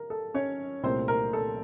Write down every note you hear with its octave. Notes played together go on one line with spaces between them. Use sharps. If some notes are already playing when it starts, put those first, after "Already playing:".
Already playing: A#4
A4
C#4 C#5
C2 A#2 A3 C4 C5
A#4
A4